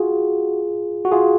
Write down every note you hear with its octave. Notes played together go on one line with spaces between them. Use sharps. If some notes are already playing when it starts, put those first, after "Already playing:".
Already playing: F4 F#4 G#4
F#4
F4 G#4